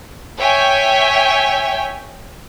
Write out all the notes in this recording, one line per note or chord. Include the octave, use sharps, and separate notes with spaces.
C#5 E5 G5 G#5